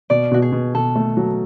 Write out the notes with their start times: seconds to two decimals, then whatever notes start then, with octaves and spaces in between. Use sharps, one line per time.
0.10 B2 D5
0.31 B2 F#4
0.42 G#4
0.52 B2
0.74 B2 A4
0.96 A3
1.17 F#3